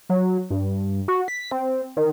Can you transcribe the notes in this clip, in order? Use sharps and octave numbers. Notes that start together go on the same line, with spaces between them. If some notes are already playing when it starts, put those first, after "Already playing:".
F#3
G2
F#4
B6
C4
D#3